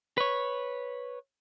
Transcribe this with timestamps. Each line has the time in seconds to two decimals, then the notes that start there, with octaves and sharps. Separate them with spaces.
0.18 B4 C#5